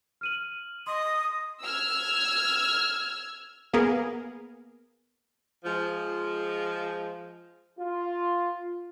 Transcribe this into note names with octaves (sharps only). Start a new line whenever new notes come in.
F6 D#7 F#7
D#5 C6 D#6
E6 F6 G#6
A#3 B3 G#4 A#4
F3 G#3
F4